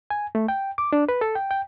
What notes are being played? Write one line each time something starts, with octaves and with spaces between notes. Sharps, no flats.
G#5
A3
G5
D6
D4
B4
A4
G5
G5